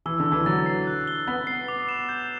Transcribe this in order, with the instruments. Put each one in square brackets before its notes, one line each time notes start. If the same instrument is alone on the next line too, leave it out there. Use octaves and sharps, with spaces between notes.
[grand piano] E3 [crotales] E6
[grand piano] D3
[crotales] E6
[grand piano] E3
[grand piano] F#3 [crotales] A6
[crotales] C7
F#6
G7
[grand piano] B3 [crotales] A6
[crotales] C7
D6
E7
G6